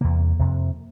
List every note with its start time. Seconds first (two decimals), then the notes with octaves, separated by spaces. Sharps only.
0.01 E2 C3 A#3
0.39 F2 C3